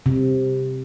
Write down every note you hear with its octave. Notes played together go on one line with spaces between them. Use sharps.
C3